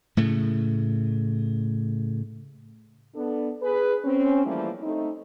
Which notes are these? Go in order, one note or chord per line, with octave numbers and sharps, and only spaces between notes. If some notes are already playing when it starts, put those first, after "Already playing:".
A2 C#3 A3
B3 D4 A4
G#4 B4
C4 C#4
E3 F3 G3 A3 A#3 E4
A3 C4 D#4